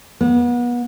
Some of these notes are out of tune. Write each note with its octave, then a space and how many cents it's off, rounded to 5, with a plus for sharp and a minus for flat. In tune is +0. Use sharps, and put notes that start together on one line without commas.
B3 -30